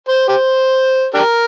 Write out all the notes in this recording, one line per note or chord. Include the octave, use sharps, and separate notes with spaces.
C5
G4 C5
D4 G4 A#4